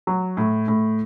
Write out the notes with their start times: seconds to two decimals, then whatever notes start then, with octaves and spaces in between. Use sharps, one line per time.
0.07 F#3
0.37 A2
0.68 A2